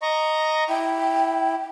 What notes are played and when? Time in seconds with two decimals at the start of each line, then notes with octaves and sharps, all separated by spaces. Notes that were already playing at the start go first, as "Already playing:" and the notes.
0.02 D#5 A#5 C#6
0.69 E4 G5